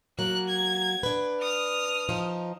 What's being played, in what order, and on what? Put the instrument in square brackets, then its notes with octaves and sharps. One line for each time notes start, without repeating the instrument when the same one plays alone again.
[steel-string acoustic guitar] F#3 A#3 [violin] F#6
[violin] G#6
[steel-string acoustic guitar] D4 B4
[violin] D#6 F6
[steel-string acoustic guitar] F3 D#4